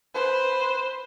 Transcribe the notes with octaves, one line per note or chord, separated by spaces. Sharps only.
B4 C5